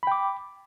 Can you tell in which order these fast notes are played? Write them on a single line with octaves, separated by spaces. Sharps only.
B5 G5 D6